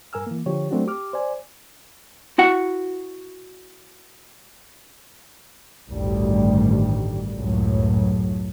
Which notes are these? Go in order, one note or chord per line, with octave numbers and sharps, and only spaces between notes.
G2 A#4 G#5 E6 F6
E3 A#3
D3 F3 G4 C#5
F#3 A3 C4 D4 F#4
G4 D6 F6
C5 D5 G#5
E4 F#4 F#5
A1 D2 G2 D#3 G3
C#2 F#2 A2 F#3